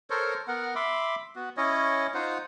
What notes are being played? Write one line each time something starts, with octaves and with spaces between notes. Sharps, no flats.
A4 A#4 C5 C#5
B3 A#4 F#5
E5 B5 C6 D6
B3 F#4
C#4 E4 C#5 D#5
D#4 F4 C5 F#5